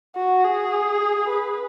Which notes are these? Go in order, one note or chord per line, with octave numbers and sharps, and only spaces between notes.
F#4
G#4
B4